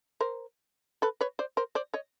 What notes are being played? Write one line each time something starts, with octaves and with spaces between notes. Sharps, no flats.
A#4 C5
A4 B4
B4 C#5
C5 D5
A#4 C5
C5 D5
C#5 D#5